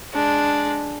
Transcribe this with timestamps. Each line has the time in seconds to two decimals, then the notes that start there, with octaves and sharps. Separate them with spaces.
0.12 G#3 D4